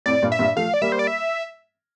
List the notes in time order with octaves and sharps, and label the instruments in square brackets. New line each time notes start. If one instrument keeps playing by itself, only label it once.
[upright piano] F2 A2 [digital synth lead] D5
[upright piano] G2 A#2
[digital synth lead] E5
[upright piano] G2 A#2
[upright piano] F3 A3 [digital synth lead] F5
[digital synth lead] D5
[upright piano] G3 A#3 [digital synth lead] E5
[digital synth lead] C5
D5
E5